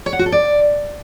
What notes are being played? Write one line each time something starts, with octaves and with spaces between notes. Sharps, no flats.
C#5
F#5
F#4
A4
D5